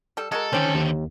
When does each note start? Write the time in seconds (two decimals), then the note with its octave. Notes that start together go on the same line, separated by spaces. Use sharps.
0.17 G3 A4
0.32 G#3 F#4 A4 A#4
0.53 D3 D#3 C#4 G4 C5
0.75 D#2